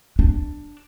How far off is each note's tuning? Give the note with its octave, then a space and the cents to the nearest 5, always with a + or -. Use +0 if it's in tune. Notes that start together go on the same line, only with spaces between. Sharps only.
D4 +5